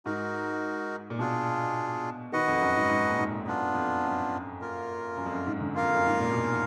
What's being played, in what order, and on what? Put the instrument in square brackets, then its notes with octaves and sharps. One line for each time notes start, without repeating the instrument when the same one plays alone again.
[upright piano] G#2 [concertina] D#4 F#4 A#4
[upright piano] A#2
[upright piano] B2 [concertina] D4 F4 G#4
[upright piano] D#3 [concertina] F#4 B4 D#5 F#5
[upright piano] F2
F#2
G#2
G#2
A#2
G#2
[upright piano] F#2 [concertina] B3 D4 F4
[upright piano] F2
F#2
[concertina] A#3 F4 A#4
[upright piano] F#2
F2
F#2
G#2
D3
[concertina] A#3 F4 A#4 F5
[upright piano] F2
F#2
G#2
A#2
B2